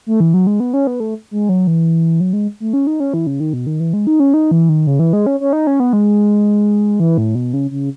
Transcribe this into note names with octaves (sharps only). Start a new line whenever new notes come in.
A3
E3
F#3
G#3
B3
C#4
B3
A3
G#3
F#3
E3
F#3
G#3
A3
C#4
D#4
C#4
E3
C#3
D#3
B2
D#3
E3
G#3
D#4
C#4
D#4
E3
D#3
C#3
E3
G#3
C#4
C#4
D#4
C#4
B3
G#3
E3
A2
B2
C#3
C#3